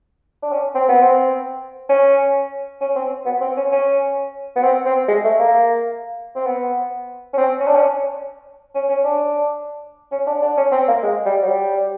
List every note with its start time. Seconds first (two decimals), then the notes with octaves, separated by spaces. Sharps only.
0.42 D4
0.52 C#4
0.75 C4
0.89 B3
1.02 C4
1.89 C#4
2.81 C#4
2.96 C4
3.25 B3
3.41 C4
3.57 C#4
3.72 C#4
4.56 B3
4.63 C4
4.85 C4
5.08 G#3
5.24 A3
5.39 A#3
6.35 C4
6.46 B3
7.33 C#4
7.38 C4
7.60 C#4
7.67 D4
7.76 C#4
8.75 C#4
8.89 C#4
9.04 D4
10.12 C#4
10.27 D4
10.42 D4
10.57 C#4
10.72 C4
10.88 A#3
11.03 G#3
11.25 G3
11.42 F#3
11.48 G3